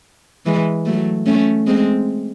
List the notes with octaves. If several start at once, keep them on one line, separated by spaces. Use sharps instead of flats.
E3 G#3
F#3 A3
A3 C#4
G#3 C4